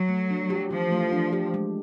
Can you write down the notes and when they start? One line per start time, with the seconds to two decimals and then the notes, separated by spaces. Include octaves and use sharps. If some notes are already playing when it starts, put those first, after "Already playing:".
Already playing: F#3
0.09 A3
0.31 D4
0.50 G4
0.71 E3 F3
0.91 A3
1.12 D4
1.33 G4
1.54 G#3